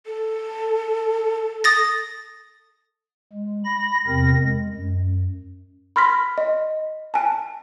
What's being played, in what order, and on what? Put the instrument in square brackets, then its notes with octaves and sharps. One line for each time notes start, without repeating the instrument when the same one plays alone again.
[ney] A4
[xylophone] D#6 A6 A#6
[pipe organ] G#3
B5 A#6
E2 C3 C4 A#4 A#6
G#3
F#2
[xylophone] B5 C6 F6 A#6 B6
D#5
G#5 A5